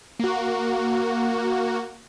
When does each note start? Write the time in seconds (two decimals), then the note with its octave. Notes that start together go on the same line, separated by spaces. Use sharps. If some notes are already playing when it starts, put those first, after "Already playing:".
0.19 A#3 F#4